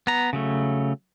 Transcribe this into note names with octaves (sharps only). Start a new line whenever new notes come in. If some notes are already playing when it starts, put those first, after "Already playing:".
B3 A#5
C#3 F#3 A3